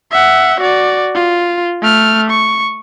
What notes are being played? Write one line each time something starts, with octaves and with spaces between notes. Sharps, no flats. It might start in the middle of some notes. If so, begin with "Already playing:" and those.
E5 F#5
F#4 D5
F4
A3 F6
C#6